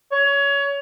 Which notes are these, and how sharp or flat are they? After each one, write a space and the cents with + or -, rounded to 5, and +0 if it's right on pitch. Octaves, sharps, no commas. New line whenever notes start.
C#5 +25